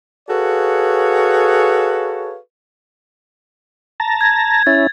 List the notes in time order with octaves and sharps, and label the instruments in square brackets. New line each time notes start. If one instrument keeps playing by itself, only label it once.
[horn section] F#4 G#4 A4 B4 C#5 F5
[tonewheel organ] A5 A#5
[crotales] G#6
[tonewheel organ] C#4 E4 [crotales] A6